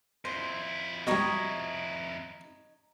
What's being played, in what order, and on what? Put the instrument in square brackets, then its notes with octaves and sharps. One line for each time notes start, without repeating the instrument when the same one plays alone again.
[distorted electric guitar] F2 E4 [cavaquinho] C5
[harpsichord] B2 G3 [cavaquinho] D#4 C#5 D#5